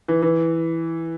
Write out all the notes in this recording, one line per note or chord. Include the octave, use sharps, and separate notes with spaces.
E3
E3